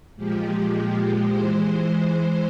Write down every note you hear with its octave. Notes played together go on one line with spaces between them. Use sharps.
A#2 F3 G#3 G4
E3 G#3 C5